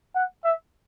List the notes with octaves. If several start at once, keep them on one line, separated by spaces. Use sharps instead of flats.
F#5
E5